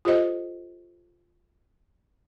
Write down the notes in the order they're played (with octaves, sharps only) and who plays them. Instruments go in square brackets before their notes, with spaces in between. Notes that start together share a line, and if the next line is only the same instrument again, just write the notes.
[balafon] F4 G4 A4 C5 D#5